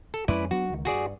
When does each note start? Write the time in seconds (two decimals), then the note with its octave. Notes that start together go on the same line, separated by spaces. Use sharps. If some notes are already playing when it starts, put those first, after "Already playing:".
0.14 A4
0.28 F2 G#3 C#4 E4 B4 D5
0.51 F#3 B3 D4 F#4
0.70 C#2 D#3
0.85 G2 F#4 G#4 D5